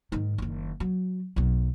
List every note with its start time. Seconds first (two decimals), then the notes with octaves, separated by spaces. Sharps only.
0.12 G#2 D#3
0.38 F#1 D#3
0.80 F#3
1.36 B1 F#2